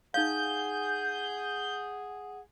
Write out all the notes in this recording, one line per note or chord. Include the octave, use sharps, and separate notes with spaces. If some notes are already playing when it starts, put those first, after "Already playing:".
D#4 G#4 F5 F#5 G6